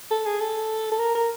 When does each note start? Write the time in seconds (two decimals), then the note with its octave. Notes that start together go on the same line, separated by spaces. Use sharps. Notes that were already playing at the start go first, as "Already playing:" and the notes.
0.11 A4
0.26 G#4
0.40 A4
0.92 A4
0.99 A#4
1.15 A#4